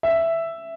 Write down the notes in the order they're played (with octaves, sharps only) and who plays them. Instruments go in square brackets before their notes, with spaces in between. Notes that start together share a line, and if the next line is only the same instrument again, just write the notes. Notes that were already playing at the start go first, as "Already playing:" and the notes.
[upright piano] E5